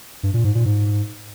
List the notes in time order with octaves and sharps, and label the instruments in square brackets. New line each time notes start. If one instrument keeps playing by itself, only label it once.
[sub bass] G2
A#2
G#2
A#2
G#2